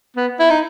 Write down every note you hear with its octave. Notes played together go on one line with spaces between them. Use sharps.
B3
E4
D#4